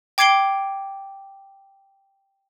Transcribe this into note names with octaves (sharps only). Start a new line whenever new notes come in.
G5 D6 G#6 C7 D7 G7